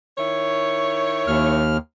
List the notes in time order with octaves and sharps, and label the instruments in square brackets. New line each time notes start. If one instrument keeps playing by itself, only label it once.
[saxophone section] D#3 E4 C#5
[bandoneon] D#2 F6